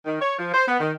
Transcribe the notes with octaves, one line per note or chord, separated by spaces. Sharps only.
D#3
C#5
F3
C5
B3
D#3